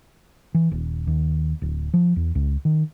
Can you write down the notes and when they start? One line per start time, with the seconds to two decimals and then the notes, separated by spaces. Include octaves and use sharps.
0.54 E3
0.71 D#1
1.07 D#2
1.62 D1
1.94 F3
2.16 E2
2.35 C#2
2.65 D#3